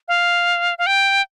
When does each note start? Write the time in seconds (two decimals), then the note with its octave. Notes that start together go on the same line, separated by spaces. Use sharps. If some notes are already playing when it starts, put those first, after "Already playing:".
0.08 F5
0.78 F5
0.87 G5